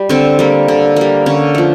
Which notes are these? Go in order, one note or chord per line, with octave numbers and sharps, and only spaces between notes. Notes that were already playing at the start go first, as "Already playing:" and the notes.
Already playing: G3
D3 C4
G3 A#3
D3
G3 A#3
D3 C#4
F3 A3